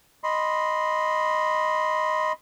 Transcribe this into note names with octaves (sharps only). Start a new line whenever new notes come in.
D#5 B5 C6